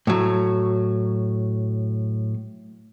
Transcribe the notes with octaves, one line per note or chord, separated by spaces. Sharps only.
A2 F#3